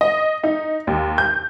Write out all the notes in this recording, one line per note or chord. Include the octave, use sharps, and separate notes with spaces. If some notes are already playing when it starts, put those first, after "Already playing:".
D#5
D#4
D#2
G6